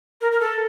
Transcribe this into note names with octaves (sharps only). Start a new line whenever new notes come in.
A#4
A#4
A4